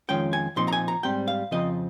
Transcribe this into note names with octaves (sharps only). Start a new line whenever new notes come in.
F2 D#3 G#3 C#4 F4 G5
G#5
A#2 F3 C4 D#4 C6
A#5
G#5
A#5
G#2 G3 C4 G5
F5
F2 C#3 F3 C4 F4 D#5